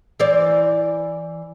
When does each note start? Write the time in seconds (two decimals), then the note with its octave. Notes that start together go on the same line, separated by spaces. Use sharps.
0.20 E3 C5 D5